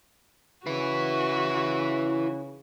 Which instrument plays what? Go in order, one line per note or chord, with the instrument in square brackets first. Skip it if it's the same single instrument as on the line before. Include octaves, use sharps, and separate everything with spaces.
[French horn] C#3 [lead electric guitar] E4 B4 [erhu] F#4